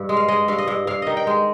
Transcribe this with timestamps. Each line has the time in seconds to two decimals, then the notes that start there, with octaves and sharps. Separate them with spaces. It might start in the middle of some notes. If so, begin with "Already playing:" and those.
Already playing: G2
0.09 G#3
0.17 F5
0.28 G#3 D#5
0.48 G2 F5
0.58 D#5
0.68 G2
0.87 G2 F5
1.02 D#3 D#5
1.17 G5
1.27 G#3